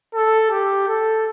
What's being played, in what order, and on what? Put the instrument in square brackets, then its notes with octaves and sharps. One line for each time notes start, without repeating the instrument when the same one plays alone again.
[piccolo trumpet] A4
G4
A4